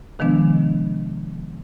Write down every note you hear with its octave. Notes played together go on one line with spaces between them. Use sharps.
C3 D#3 F3 G#3 B3 D4